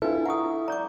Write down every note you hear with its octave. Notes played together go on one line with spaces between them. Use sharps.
D4 E4 F4 A4 B4
F#5 A#5 C#6 D#6
D5 A#5 D6 G6